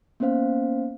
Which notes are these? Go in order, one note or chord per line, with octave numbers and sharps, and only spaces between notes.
A#3 B3 C#4 C5 F5